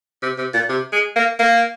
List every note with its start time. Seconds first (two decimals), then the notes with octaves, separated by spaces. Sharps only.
0.23 C3
0.38 C3
0.54 A#2
0.69 C3
0.93 G#3
1.16 A#3
1.39 A#3